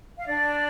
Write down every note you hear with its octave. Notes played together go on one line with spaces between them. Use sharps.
F5
D4 D5